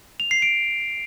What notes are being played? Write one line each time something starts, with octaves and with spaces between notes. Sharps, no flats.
F7
C7
D7